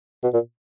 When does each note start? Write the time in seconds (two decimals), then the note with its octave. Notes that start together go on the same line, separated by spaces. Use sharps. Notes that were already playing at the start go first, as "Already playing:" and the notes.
0.23 B2
0.34 A#2